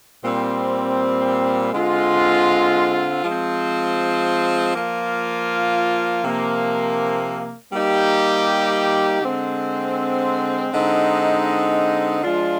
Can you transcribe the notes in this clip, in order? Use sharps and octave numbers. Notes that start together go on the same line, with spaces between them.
A#2 G3 C4
D3 G#3 C4 F4
F3 G#3 C4
F3 A#3 F4
C3 F3 A#3
G3 A#3 D#4 G4
D3 G#3 C4
D3 G#3 C4 D#4
F3 G#3 D4 F4